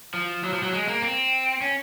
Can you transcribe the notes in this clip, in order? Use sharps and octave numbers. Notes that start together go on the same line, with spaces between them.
F3
F#3
F3
F#3
G#3
A#3
C4
C#4